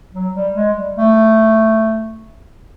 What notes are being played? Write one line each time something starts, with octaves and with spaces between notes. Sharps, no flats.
F#3
G3
G#3
G3
A3